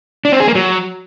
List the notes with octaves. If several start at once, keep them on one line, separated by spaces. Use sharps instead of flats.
D4
C4
G#4
A#3
F#3